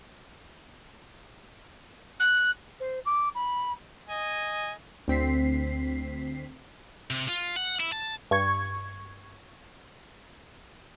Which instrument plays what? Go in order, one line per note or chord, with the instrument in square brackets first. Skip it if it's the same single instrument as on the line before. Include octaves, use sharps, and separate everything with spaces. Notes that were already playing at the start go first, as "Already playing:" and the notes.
[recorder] F#6
[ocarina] C5
D6
B5
[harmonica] D#5 G#5
[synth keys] D2 C4 B6 C7
[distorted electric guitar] C3
F4
F#5
E4
A5
[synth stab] G2 C#6 G#6